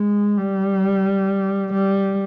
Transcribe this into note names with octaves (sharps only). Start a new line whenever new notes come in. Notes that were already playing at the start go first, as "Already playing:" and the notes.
Already playing: G#3
G3
G3